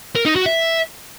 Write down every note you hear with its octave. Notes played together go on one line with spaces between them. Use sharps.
A#4
D#4
F#4
E5